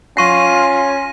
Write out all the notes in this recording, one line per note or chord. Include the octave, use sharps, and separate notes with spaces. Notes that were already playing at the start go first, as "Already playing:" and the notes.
C#4 F4 F#5 C#6 A#6 D#7